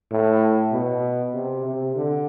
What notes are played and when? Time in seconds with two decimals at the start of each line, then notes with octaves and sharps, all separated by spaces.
0.11 A2
0.73 B2
1.34 C3
1.65 C3
1.96 D3